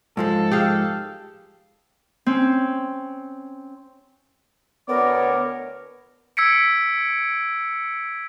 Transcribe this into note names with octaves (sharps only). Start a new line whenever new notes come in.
G#2 F3 G#3 A4
G4 G#4 F5
C4 C#4
D2 B3 A#4 C#5 D5
E6 G#6 B6 C#7 D7